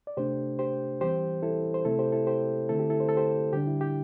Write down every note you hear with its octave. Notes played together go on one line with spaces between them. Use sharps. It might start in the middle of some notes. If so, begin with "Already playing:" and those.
D5
C3 A3 D4 G4 C5
G4 C5
E3 G3 C4 G4 C5
E4 A4
C5
C3 A3 C4 E4 A4
G4 C5
E4 A4
G4 C5
D3 A3 C4 E4 A4
G4
E4 A4
C5
A4
G4 C5
D3 G3 D4 G4
E4
G4